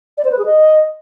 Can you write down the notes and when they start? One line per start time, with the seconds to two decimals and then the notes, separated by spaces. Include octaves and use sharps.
0.17 D5
0.24 C5
0.31 B4
0.38 G#4
0.45 D#5